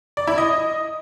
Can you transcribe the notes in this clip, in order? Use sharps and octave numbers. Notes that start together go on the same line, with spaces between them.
D5
E4
D#5